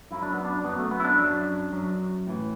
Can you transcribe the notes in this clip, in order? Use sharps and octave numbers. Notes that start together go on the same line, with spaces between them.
F#2 F#3 E4
D4
B3
D4
F#2 F#3 B3
A3
B3
E4
D4
F#2 F#3
F#2 F#3
A2 E3